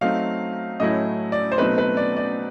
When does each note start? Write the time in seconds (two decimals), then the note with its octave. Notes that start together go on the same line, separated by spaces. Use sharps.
0.01 F#3 A3 C4 D#4 F5
0.80 A2 F#3 A3 C#4 E4 D#5
1.32 D5
1.52 C5
1.58 B2 F#3 A3 C4 D#4 B4
1.78 B4
1.97 D5
2.16 D5